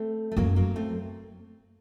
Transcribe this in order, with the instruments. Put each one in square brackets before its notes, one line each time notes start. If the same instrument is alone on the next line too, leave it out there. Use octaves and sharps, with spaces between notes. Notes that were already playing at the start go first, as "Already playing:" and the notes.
Already playing: [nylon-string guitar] A3 C4
A3
[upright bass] F#2 [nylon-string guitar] F#3 A#3
[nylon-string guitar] F#3 A#3
A3 C4